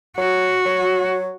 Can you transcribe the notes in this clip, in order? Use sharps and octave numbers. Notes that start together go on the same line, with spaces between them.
F#3 F#4
F#3